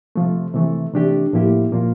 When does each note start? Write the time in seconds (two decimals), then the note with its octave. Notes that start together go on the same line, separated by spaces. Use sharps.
0.16 C3 F3 A3
0.54 C3 E3 A3
0.93 C3 E3 A3 D4 G4
1.33 A2 F3 A#3 E4 G4
1.72 A#2 F3 A#3 F4